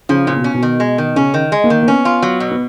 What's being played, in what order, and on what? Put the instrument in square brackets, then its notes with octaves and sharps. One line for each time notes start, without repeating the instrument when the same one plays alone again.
[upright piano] C#3 [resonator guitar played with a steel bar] F3
[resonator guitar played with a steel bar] A#2 [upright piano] C#3
[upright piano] B2
[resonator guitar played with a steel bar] C#4
[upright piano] B2
[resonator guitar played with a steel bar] D#3
G#3
D#3
[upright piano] C#3 [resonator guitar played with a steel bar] C#4
[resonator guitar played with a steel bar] D#3
G#3
[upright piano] A#3
[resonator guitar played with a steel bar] D#3
[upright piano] A#3
[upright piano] B3 [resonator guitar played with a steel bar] C#4
[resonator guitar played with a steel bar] F4
F#3
B2
[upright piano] B3